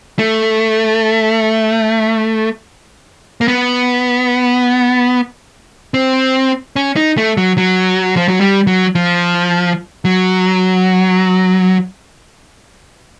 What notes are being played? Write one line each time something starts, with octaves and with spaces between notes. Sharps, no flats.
A3
A#3
B3
C4
C#4
D#4
A3
F#3
F#3
F3
F#3
G3
F#3
F3
F#3